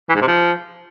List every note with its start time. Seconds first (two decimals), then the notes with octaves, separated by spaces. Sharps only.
0.09 E3
0.15 G#2
0.22 C3
0.28 F3